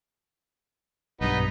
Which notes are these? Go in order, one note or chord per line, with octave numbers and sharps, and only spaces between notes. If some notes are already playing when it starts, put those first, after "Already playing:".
B1 G2 B3 D#4